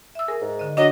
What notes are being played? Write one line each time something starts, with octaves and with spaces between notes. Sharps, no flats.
E5 E6
G#4 A#4
G#2
D3 D#5
F#3 D4 D#5